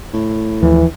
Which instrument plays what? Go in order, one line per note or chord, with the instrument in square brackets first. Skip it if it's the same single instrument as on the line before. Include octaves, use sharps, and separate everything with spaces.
[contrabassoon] A2
[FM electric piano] D#2 F3 [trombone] E3